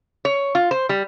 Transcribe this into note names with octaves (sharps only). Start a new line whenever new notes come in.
C#5
F4
C5
G3